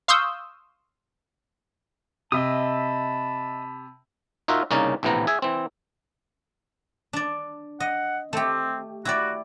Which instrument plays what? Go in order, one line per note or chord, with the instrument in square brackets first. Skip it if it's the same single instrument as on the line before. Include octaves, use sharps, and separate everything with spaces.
[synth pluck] F5 C6 C#6 D#6 E6 G6
[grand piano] C3 [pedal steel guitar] D#5 E5 D#6 [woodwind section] A5 B5
[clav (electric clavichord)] D#4 F4 F#4 A#4 E5
C2 C#3 A#3 C#4 D#4 D5
A#1 A2 C3 E3 B3 A#5
G#4 E5 G#5
E3 C4
[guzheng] D4 D5
[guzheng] D#5 [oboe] F#5
[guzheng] A3 G4 [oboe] C4
[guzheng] E4 G4 D5 [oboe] F#4